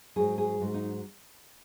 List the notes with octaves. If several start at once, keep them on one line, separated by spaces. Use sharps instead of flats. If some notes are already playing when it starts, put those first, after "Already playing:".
G#2 F#3 G#4
G#4
G#2 F#3
D#4